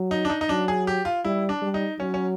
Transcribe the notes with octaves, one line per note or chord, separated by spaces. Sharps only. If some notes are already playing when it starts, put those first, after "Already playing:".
Already playing: F#3
D#4
D4
D#4
D#4
F#3 D4
G#4
G4
F4
G3 E4
D4
G3
D#4
F#3 C#4
C#4